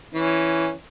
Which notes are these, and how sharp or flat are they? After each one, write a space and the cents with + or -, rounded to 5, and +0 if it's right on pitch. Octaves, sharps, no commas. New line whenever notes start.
E3 +0 C#4 +0